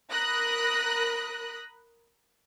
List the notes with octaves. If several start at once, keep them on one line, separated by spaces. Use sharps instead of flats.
A#4 B5 D#6 F#6 A#6